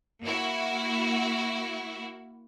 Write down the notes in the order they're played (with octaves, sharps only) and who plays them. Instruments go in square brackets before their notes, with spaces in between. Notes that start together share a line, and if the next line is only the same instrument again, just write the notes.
[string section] A#3 E4 F#4